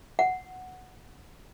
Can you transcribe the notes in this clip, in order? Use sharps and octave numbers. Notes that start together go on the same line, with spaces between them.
F#5